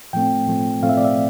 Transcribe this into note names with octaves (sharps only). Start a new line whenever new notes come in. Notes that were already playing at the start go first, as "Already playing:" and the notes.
A2 F3 A3 C4 G5
A2 F3 A3 C4
A2 F3 A3 C4 F5
E5
D5
E5